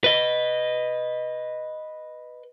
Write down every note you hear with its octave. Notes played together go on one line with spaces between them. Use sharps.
B4 D#5